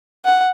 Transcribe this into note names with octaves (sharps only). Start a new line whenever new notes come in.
F#5